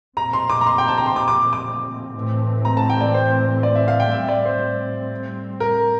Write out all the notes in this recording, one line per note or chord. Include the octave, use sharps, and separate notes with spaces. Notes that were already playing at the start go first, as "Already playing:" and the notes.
A#2 F3 A3 C4 A#5
C6
D6
A#5
C6
G5
A5
A#5
C6
D6
D6
D6
A2 E3 A3 C4
A#5
A5
G5
D5
C5
D5
E5
F5
G5
A2 G3 C4 E5
D5
C5
A#4